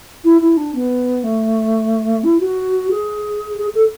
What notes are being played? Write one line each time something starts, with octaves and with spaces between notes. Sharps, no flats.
E4
E4
D4
B3
A3
E4
F#4
G#4
G#4
A4